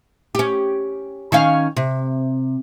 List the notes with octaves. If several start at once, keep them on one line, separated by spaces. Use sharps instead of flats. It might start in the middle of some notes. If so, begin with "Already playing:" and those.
C#4 G4
D#3 C#4 F5
C3